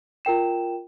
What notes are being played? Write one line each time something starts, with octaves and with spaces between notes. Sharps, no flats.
F4 A#4 G5 E7